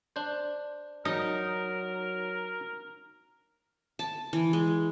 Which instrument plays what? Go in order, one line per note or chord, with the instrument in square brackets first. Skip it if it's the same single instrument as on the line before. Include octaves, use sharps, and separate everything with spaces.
[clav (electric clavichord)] D4 C5
[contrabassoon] F#3 [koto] D#4 [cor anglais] A#4
[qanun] A5
E3
G#3